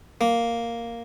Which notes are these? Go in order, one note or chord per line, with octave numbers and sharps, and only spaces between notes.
A#3